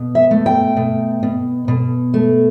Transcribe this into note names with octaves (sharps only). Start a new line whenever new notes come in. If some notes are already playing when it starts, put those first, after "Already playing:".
Already playing: B2
E5
A3
G5
B2
B2
B2
A3